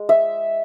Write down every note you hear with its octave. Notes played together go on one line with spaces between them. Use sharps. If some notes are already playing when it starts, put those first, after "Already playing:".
Already playing: G#3
E5